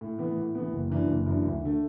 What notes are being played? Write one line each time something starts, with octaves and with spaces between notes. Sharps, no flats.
A2
E3 B3
A2
E3 B3
F#1
F#2 E3 D4
F#1
F#2 E3 D4
D2
D3 A3